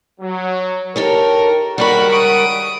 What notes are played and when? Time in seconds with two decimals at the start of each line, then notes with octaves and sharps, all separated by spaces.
0.20 F#3
0.96 D#4 G4 A4 A#4 C#5
1.78 C#2 D#3 G3 F#4 G4 A#4 F#5 B5
2.12 D#6 D7